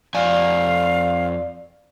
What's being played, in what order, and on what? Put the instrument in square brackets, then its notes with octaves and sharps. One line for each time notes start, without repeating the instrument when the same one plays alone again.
[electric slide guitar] F2 G#5 [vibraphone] D5 [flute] F5